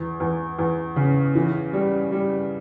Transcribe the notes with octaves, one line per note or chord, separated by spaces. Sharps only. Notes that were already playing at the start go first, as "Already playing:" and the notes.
Already playing: E2
E2
E2
C#3
E3
G3
G3